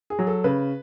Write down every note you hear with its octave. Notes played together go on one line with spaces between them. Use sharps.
G#4
F#3
A4
C#3 B4